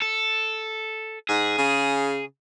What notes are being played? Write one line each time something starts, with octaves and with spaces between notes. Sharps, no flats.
A4
G#2 G#4
C#3